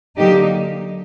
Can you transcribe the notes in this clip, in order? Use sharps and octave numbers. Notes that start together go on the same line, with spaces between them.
D3 F#3 A#3 D#4 G4